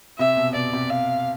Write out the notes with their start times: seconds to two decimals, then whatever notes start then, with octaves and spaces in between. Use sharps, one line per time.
0.18 C3 E5
0.36 B2
0.55 B2 D5
0.73 C3
0.90 F5